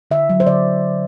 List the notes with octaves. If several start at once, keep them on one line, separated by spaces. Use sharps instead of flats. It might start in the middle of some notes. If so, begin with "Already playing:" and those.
D3 E5
F#3
C5
D3 D5